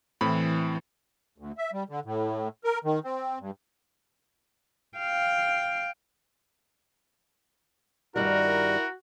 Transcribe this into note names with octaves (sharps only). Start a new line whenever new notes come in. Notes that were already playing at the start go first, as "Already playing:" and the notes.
A2 E3 C4 B5
D2
E5
G3
D3
A2
A#4
D#3
C4
G2
F5 G5
G2 D#3 G3 E4 F#4 A#4